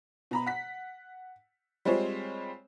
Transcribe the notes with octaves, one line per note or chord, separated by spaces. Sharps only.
B2 A#5 B5
F#5 B6
G3 G#3 C4 F4 C5 C#5